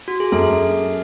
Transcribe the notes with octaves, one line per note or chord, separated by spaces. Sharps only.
F#4
G#4
F#2 A4